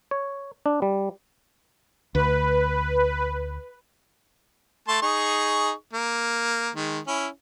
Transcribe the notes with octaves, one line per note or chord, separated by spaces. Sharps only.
C#5
D4
G3
D2 B4
A3 A5 C6
D#4 G#4 C#6
A#3
D#3 G#3
C#4 E4